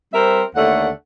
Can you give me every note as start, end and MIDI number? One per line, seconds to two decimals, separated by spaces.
0.14 0.42 55
0.14 0.42 60
0.14 0.42 70
0.14 0.42 72
0.14 0.42 76
0.56 0.88 39
0.56 0.88 50
0.56 0.88 57
0.56 0.88 78